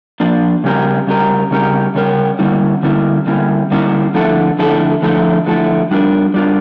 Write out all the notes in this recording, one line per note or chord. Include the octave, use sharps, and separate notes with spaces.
F3 A#3 D4
C#3 G3 C#4 G4 A#4
C#3 G3 C#4 G4 A#4
C#3 G3 C#4 G4 A#4
C#3 G3 C#4 G4 A#4
D3 G3 A#3 C#4 E4
D3 G3 A#3 C#4 E4
D3 G3 A#3 C#4 E4
D3 G3 A#3 C#4 E4
D3 F3 A3 E4 A4
D3 F3 A3 E4 A4
D3 F3 A3 E4 A4
D3 F3 A3 E4 A4
G3 D4 F4 A#4
G3 D4 F4 A#4